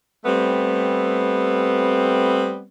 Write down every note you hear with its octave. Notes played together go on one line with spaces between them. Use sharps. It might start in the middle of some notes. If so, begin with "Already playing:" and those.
G3 A3 B3 C4